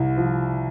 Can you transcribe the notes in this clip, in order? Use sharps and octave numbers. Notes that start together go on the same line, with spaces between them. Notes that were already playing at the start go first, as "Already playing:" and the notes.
Already playing: C2
F3